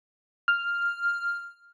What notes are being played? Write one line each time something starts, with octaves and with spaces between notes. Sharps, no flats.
F6